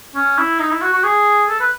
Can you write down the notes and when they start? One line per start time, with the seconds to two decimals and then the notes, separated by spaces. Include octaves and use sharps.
0.15 C#4
0.38 E4
0.60 D#4
0.71 E4
0.82 F#4
0.93 F#4
1.04 G#4
1.49 A4
1.60 B4